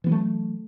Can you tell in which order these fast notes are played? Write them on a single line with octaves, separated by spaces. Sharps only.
E3 B3 F#3 A3